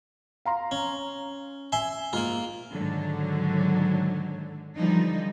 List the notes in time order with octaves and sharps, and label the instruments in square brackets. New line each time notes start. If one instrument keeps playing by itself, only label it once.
[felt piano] F5 A#5 C6
[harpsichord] C#4
[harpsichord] E5 C6 [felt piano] G#5
[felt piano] G#2 [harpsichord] A#3 F4
[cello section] G#2 D3 D#3 F#3
D3 E3 F3 G3 D#4